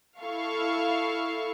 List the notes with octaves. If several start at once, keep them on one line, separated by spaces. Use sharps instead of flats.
E4 A4 F5 C#6